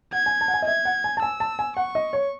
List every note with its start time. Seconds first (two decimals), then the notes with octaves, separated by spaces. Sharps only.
0.13 F#5 G#6
0.26 G#5
0.41 A5
0.48 F#5
0.54 G#5
0.62 D#5
0.68 E5 G#6
0.85 F#5
1.04 G#5
1.17 A5
1.22 G#5 E6
1.40 A5
1.59 G#5
1.77 F#5 C#6
1.95 D#5
2.13 C#5